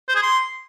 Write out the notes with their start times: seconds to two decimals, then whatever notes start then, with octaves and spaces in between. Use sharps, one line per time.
0.09 C5
0.16 G#4
0.22 C6